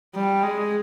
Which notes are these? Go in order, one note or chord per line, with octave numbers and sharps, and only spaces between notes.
G3
G#3